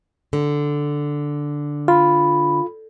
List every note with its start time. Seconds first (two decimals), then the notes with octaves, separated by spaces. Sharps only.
0.33 D3
1.88 F4 B5